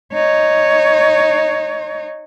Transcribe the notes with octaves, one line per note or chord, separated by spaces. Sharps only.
D#4 C#5